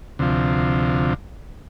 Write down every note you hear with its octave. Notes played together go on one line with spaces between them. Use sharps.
D2 C3 F3